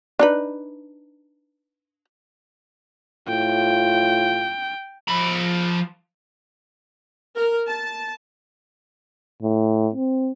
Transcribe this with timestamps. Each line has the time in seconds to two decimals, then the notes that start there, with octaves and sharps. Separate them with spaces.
0.19 D4 D#4 B4
3.28 A2 F4 G5
5.08 F3 B5
7.35 A#4
7.68 A5
9.42 A2
9.95 C4